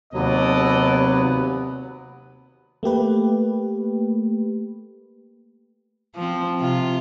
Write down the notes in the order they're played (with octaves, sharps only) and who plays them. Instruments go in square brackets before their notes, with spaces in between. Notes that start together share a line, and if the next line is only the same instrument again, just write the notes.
[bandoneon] D#2 F#3 [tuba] C3 [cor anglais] B3 [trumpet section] A4 D5 D#5
[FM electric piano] A3 A#3 G4 B4
[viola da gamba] F3 C4
C3 F4